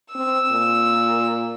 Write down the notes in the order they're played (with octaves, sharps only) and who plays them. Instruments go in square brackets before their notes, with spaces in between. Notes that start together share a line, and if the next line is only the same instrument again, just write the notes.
[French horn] C4 [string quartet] E6
[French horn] A#2